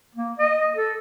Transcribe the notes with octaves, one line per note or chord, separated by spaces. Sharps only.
A#3
D#5
A4